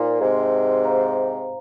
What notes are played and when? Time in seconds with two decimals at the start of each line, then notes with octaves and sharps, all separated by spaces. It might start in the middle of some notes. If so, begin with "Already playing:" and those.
Already playing: A#2 D#4 C5 G#5 C6
0.21 G#2 C3
0.84 C5 F5 A#5